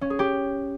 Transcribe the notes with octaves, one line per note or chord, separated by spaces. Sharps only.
C#4
G#4
G4